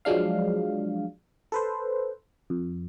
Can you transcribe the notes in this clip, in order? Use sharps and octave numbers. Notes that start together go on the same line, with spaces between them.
F3 F#3 G#3 D4 F5
A4 B4 C5
F2